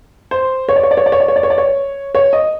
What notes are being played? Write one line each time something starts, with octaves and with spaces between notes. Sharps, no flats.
C5
C#5
D5
C#5
D5
C#5
D5
C#5
D5
C#5
D5
C#5
D5
C#5
C#5
D#5